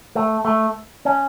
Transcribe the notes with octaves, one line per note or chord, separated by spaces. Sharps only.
A3
A3
C#4